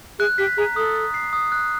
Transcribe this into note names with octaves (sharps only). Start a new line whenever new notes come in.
G#4 F#6
G4 B6
G#4 A#5
A4 D#6
A6
C7
D#6
F#6